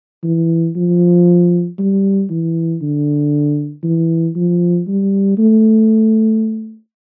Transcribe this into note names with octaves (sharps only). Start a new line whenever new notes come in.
E3
F3
G3
E3
D3
E3
F3
G3
A3